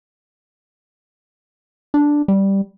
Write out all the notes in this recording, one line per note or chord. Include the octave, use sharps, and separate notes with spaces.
D4
G3